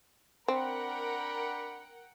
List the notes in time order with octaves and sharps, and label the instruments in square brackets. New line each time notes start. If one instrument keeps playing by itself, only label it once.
[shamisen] C4 [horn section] D4 B5 [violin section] A#4 F#5 G5